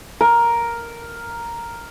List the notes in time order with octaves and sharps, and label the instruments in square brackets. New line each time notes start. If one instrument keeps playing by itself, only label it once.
[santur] A#4